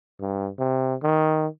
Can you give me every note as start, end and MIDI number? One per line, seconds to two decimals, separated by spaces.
0.21 0.50 43
0.59 0.95 48
1.03 1.47 51